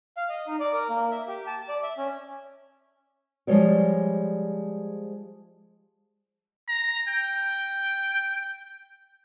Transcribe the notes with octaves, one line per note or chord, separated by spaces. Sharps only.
F5
D#5
D#4
D5
A#4
A#3
E5
G4
A5
D5
E5
C#4
F3 G3 G#3 A4 C#5 D5
A#5
G5